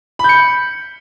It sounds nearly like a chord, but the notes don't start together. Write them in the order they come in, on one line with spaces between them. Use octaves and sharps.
B5 G6 C#7